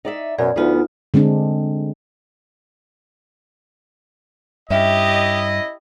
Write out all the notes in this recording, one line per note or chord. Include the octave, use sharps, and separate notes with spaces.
D#4 D5 E5
F#2 B2 D5
D2 F3 B3 D#4 F4 E5
D3 G#3 C4 D4
G2 C#4 E4 G4 D#5 E5